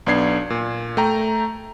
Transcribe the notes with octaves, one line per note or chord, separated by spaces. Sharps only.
B1 B3 D4 G#6 C7
A#2
A3 G5 A#5